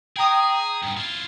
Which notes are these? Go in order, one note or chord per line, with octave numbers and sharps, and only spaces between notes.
G#4 G5 A#5 D#6
G2 B3
E4 F4